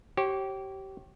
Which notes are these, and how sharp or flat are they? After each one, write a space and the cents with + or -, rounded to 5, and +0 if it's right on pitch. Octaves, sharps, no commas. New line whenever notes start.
G4 -25 C#5 -40